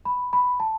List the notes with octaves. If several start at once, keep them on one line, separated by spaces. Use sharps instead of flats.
B5
B5
A5